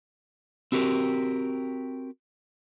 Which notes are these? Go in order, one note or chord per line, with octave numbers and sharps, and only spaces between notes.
C4 F#4 G4 A#4